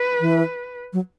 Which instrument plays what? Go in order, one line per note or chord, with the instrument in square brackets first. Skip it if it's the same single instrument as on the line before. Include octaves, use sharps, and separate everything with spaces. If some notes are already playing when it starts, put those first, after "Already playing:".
Already playing: [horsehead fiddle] B4
[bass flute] E3
F#3